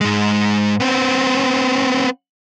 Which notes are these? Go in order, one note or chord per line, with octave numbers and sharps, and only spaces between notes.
G#2 G#3
B3 C4